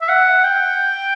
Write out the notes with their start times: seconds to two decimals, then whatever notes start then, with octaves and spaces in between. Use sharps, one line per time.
0.02 E5
0.09 F#5
0.44 G5